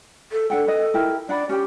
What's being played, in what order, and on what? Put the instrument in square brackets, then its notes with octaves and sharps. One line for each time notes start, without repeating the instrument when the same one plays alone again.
[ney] A4
[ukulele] D4 F#5 G5 [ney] A4
[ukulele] B4 D#5
E4 G4 A#4
[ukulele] D4 F#5 B5 [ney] D5
[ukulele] C#4 G5 [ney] G4